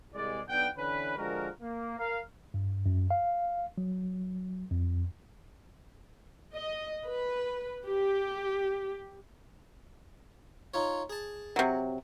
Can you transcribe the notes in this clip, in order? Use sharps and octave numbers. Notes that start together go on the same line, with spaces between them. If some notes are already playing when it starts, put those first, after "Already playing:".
C2 G#3 D5
B1 B3 D4 F#5 G5
D3 E3 C#4 B4
D3 F3 G#3 F#4 A#4
A#3
A#4 F5
G2
F#2
F5
F#3
F2
D#5
B4
G4
D#4 F4 C#5
G#4 A5
C3 F#3